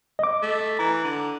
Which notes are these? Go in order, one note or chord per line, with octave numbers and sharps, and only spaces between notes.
D#5 D6
A3
E3 A#5
D3